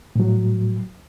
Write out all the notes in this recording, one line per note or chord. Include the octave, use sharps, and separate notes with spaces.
A2 F#3